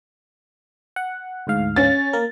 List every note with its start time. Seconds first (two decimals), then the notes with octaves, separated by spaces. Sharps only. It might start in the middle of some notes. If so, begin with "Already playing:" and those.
0.96 F#5
1.47 D2 G#2 F5
1.76 C#4 A6
2.13 A#3 A#4